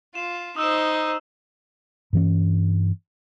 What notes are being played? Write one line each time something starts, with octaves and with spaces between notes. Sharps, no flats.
F4 E7
D#4 C5 D#6 E6 E7
G2 E3 C#4